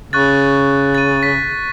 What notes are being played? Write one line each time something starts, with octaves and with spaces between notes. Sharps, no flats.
C#3 C#6 F#6 A6
A6 D#7
B6